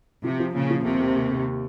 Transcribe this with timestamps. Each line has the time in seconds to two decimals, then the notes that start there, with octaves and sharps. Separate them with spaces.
0.24 C3 F3
0.40 F3
0.55 A#2 C#3
0.71 F3
0.85 D#2 C3
1.00 D#2
1.16 D#2
1.32 D#2